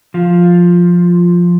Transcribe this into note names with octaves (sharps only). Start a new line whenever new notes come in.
F3 F4